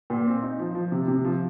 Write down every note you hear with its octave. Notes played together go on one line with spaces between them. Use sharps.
A#2
C4
D#4
F3
F3
C3
C3
F3